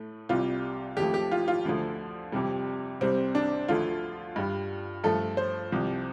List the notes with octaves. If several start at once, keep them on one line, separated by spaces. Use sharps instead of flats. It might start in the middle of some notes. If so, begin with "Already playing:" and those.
Already playing: A2 A3
C2 C3 G3 F4
F2 F3 A3 G4
G4
F4
F4
D2 D3 F3 A3
F2 C3 G3
C2 C3 G3 C4
D4
D2 D3 F3 A3 F4
G2 G3
G2 F3 A3 A4
C5
C2 C3 F3